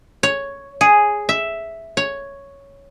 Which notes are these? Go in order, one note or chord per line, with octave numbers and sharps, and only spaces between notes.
C#5
G#4
E5
C#5